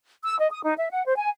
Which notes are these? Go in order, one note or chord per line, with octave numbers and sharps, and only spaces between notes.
E6
D#5
D#6
D#4
E5
F#5
C5
G#5